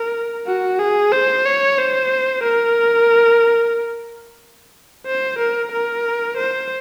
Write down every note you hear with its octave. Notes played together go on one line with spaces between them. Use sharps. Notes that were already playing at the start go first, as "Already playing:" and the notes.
Already playing: A#4
F#4
G#4
C5
C#5
C5
A#4
C5
A#4
A#4
C5